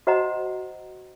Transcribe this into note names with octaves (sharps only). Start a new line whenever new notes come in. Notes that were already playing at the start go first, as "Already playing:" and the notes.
F#4 C5 D#5 F#5 A#5